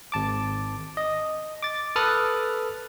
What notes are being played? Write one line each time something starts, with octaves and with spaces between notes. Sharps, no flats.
G#1 A5 D6
D#5
D6 A6
A4 B4 D#6 F6 F#6 A6